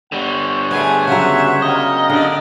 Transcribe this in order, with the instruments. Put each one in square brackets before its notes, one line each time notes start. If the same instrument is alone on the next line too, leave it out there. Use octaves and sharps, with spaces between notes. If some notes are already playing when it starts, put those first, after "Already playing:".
[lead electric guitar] D3 G3 [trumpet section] C5 C#5 F#5
[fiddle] A3 G#5 [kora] B3 G#4
[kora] C#3 F#3 [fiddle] E5
[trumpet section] G3 A#3 [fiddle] C#5 [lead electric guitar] D#5
[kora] D3 [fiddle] G4 D5